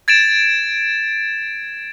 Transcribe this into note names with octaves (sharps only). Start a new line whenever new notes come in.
G#6 A6 D7 E7